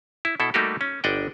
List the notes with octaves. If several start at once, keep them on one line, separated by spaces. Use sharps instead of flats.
E4
B2 E4 A4
G3 A3 A#3 D#4 F#4 G4
C#4
G1 D4 D#5 F#5 G5